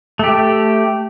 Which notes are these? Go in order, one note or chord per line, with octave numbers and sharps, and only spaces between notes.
A3 G4